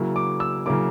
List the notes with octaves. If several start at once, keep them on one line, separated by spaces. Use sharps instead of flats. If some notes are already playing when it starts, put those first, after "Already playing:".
Already playing: C#3 F#3 A#3 E4
D6
E6
C#3 F#3 A#3 E4 D6